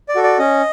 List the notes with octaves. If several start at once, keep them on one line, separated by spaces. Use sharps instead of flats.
D5
F#4 A4
D5
C#4 D#5